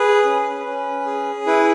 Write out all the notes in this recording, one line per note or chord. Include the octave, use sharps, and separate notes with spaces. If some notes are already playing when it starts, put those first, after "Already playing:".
Already playing: G#4 B4
C#4
C#4
G#4
E4 B4